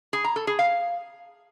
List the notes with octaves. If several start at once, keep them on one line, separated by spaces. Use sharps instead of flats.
G#4
A#5
A4
G#4
F5